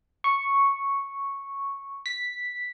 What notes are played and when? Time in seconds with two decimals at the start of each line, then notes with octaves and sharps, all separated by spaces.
0.24 C#6
2.06 B6